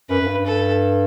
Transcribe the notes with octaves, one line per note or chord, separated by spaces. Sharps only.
F#2 B4
F#2
G2
A4